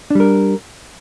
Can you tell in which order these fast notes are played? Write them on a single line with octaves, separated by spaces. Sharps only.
D4 G3 A#4